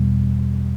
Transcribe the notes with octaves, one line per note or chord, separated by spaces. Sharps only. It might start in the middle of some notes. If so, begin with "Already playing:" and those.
Already playing: E2 B2 G3